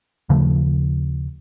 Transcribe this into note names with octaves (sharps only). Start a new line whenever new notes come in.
D#2 C#3 F3 A3